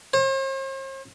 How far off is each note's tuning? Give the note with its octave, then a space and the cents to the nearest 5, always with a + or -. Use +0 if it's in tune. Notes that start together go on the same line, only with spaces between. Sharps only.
C5 +45